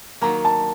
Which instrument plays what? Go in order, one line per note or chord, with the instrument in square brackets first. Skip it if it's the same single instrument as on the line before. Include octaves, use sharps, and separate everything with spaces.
[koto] D#3 F#3 A#3 [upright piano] A#5
[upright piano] A5